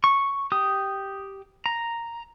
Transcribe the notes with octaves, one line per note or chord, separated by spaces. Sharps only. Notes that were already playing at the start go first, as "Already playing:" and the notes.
C#6
G4 D#6
A#5